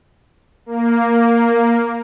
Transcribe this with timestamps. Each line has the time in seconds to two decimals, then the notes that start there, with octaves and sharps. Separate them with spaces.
0.66 A#3